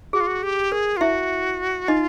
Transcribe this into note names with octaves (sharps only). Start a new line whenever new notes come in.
F#4 G#4
F4
F#4
G4
G#4 A#4
F4
E4 F#4 E5
D#4 F4 D#5